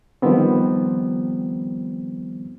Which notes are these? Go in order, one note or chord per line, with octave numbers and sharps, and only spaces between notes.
D#3 F3 G3 B3 C4